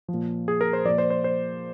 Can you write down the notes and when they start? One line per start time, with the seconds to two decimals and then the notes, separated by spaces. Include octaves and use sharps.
0.08 F3
0.14 A#2
0.48 G#4
0.61 A#4
0.73 C5
0.85 A#2 F3 D5
0.98 C5
1.10 C5
1.24 C5